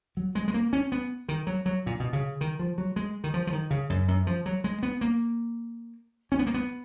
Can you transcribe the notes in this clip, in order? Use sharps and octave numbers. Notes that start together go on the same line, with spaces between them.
F#3
G#3
G#3
A#3
C#4
B3
D#3
F#3
F#3
A#2
B2
C#3
D#3
F3
F#3
G#3
D#3
F3
F3
D#3
C#3
F#2
F#2
F3
F#3
G#3
B3
A#3
C#4
B3
A#3
B3